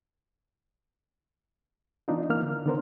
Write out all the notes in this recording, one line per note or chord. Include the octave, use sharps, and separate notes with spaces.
E3 B3 D4 D#4 F4
E3 A#3 F6
D3
D3 D#3 B3 D4 A#4 C5